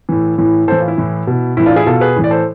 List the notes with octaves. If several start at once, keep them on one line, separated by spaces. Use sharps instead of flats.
A2 E3
A2 E3
A2 E3 A4 C5
F4
E4
A2 E3
B2
A2 E3 E4
D4 F4
E4 G#4
B2 F4 A4
G#4 B4
A2 E3
D5
A4 C5